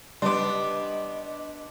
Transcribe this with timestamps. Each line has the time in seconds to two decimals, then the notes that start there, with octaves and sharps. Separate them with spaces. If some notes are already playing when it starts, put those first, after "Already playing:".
0.22 G3 B3 D4 D#5 C6 D6